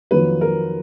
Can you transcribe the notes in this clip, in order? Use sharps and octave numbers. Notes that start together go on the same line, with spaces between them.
F2 D#3 F#3 A#3 B4
A#4